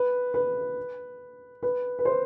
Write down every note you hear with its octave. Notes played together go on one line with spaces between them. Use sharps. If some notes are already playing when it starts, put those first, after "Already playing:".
Already playing: B4
B4
B4
B4
C5